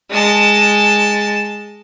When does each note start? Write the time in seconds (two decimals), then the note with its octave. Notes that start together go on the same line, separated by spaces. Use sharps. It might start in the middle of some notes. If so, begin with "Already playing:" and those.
0.11 G#3 A5